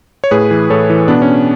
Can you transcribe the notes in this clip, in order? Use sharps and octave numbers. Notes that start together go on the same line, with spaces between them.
C#5
A2 G#4 B4
E3
A2 A4 C#5
E3
B2 B3 D4
C#4